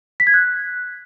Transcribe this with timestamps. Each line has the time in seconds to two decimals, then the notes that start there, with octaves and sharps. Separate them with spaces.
0.20 B6
0.27 G#6
0.34 F#6